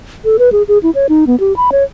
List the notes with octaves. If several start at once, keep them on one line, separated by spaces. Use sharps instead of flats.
A4
B4
G#4
G#4
E4
C#5
D#4
B3
G4
B5
C#5